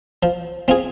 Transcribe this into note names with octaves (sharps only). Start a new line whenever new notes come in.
F3
C4 F4 G#4